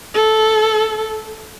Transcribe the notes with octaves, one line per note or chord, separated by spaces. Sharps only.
A4